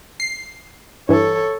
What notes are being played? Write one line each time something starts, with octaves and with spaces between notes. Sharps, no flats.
C7
G2 E3 A4 C#5